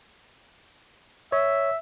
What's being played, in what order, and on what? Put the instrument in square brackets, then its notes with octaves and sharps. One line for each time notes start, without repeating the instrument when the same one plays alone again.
[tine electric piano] C#5 [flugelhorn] E5